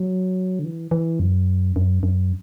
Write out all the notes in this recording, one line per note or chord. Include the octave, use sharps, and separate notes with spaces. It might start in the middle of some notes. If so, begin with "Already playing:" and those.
Already playing: F#3
D3
E3
E3
F#2
F#2
F#2